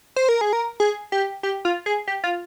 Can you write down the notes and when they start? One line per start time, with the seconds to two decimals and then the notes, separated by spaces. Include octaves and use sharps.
0.16 C5
0.29 A#4
0.41 G#4
0.53 A#4
0.80 G#4
1.12 G4
1.43 G4
1.65 F4
1.86 G#4
2.07 G4
2.24 F4